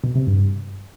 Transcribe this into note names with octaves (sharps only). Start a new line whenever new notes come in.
B2
C3
G2